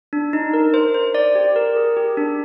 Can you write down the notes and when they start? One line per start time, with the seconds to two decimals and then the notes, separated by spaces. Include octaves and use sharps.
0.13 D4
0.33 D#4
0.53 A#4
0.74 C5
0.94 C5
1.15 D5
1.35 G4
1.56 A#4
1.76 G#4
1.97 G4
2.17 D4